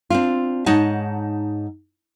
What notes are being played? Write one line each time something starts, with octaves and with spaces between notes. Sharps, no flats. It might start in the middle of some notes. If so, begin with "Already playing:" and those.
C4 D4 F4
G#2 D#4 C#5 D#5 F#5 A5